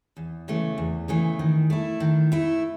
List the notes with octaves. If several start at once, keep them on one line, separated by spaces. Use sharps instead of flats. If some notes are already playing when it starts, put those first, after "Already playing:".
E2
C#3 E3 A3
E2
C#3 E3 A3
D#3
A3 E4
D#3
A3 E4